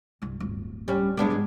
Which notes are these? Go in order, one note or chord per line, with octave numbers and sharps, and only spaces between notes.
C2 G2
D1 G1
G3 C#4
F#2 A2 G#3 B3 D4
G#2 E3